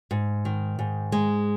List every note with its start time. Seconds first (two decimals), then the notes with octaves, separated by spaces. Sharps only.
0.11 G#2
0.45 D#3
0.79 G#2
1.12 G#3